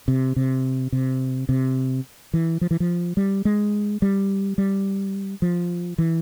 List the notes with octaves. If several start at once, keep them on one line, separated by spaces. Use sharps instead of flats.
C3
C3
C3
C3
E3
F3
E3
F3
G3
G#3
G3
G3
F3
E3